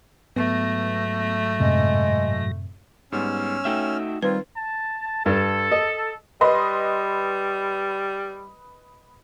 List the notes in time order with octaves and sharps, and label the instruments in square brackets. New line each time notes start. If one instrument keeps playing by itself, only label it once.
[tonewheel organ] G#2 F#3 A#6 [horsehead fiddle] A3 [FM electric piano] B3
[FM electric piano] F#2 A2 C3 [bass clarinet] G#3
[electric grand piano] G#2 G3 B3 [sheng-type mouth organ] C#4 E6 F6
[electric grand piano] A3 G5 E7 [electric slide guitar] D#4 F#4 E5
[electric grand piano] D#3 C4 D#4 [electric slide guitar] G3 [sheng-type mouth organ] F4 [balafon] B4
[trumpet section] A5
[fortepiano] G2 [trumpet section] A4
[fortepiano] D#5
[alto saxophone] G3 [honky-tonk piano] B4 D#5 C6